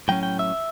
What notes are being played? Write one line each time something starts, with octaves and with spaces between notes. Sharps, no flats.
A2 F#3 C#4 G5
G5
E5